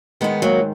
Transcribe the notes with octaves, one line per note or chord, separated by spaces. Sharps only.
G#2 D#3 G#3 B3
F#3 A#3